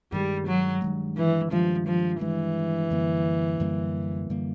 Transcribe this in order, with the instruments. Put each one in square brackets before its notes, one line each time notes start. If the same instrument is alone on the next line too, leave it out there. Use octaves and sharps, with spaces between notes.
[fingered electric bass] G2 D#3 G#3 [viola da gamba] G3
[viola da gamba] F#3
[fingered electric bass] G2 D#3 G#3
[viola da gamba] E3
[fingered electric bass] G2 D#3 G#3 [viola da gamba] F3
[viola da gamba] F3
[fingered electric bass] G2 D#3 G#3 [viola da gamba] E3
[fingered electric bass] F#2 D3 G3 A#3
F#2 D3 G3 A#3
F#2 D3 G3 A#3